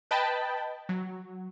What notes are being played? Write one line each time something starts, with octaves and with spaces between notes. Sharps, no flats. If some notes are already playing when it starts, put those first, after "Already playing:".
B4 D#5 G5 A5 B5
F#3